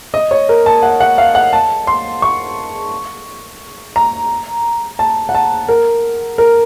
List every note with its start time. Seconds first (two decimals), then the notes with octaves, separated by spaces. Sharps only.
0.14 D#5
0.31 C#5
0.49 A#4
0.66 A5
0.83 F#5
1.00 F#5
1.18 F5
1.35 F#5
1.53 A5
1.87 C6
2.22 C#6
3.96 A#5
4.99 A5
5.29 F#5
5.35 A5
5.68 A#4
6.38 A#4